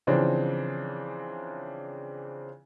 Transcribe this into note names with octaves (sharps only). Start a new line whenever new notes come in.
C#3 E3 F3 C4 D4